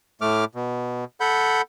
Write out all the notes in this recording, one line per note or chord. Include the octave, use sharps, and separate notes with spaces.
A2 A3 D6 F6
B2
A4 F#5 B5 G6